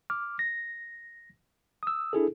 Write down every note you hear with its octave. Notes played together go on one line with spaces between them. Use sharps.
D6 F6
A#6
D#6 E6
D4 E4 G#4 A4